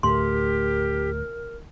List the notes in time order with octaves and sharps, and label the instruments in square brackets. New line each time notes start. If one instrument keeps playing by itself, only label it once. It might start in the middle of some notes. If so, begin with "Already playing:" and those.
[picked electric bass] D2 A2 [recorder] G4 [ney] A#4 [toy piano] C6